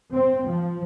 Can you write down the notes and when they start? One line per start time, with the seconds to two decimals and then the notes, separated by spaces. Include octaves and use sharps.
0.14 C4
0.48 F3